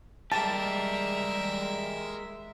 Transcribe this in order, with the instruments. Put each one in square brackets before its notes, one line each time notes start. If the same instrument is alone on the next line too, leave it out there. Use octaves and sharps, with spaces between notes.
[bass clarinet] G3 [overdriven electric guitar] G#3 G4 [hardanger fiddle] A#4 E5 [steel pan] A5